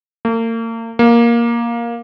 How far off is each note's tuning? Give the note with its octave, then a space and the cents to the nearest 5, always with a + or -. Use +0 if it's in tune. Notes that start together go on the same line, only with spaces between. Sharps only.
A#3 -40
A#3 +10